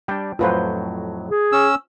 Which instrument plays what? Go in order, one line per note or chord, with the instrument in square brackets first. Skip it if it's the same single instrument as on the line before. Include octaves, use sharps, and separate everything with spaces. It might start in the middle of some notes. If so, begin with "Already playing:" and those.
[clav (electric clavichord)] G3 D4 [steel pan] G5
[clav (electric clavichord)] F2 A2 F#3 [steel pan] F4 B4 C5
[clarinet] G#4
[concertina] C#4 E6